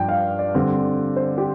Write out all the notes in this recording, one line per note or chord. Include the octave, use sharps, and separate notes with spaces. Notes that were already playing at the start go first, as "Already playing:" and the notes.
Already playing: G2 F3 D4 G5
F5
D5
D3 G3 C4
C5
G4